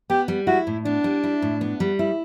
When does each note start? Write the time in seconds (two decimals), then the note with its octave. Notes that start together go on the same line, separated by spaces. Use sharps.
0.10 B3 G4
0.28 G3
0.47 E4 F#4
0.67 A2
0.85 B3 D4
1.04 G3
1.24 E4
1.42 A2
1.61 B3
1.80 G3
1.99 E4